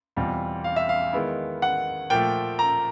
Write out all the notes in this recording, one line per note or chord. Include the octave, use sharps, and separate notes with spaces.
E2 B2 G3 C4 F4
F5
E5
F5
D#3 G#3 B3 E4
F#5
A#2 F3 A3 G5
A#5